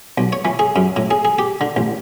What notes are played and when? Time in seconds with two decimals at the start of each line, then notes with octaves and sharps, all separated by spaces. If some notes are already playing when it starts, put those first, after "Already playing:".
0.18 B1
0.33 C#5
0.45 E3
0.59 G#4
0.76 F#2
0.96 A2
1.11 G#4
1.25 G#4
1.39 G4
1.61 D3
1.76 A1